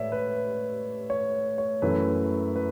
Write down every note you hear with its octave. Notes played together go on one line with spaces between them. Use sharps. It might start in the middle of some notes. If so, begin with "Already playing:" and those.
Already playing: A2 A3 B4 C#5 D5 E5
B4
C#5
C#5
F#2 E3 A3 B4
B4